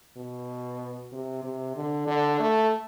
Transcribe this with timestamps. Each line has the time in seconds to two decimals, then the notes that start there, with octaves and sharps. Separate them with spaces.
0.17 B2
1.13 C3
1.43 C3
1.76 D3
2.07 D3
2.39 A3